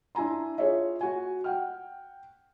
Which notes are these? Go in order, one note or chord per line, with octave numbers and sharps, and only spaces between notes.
D4 E4 G#5 A#5 C6
F4 G#4 C#5 E5
F#4 G#5
F#5 G5 F6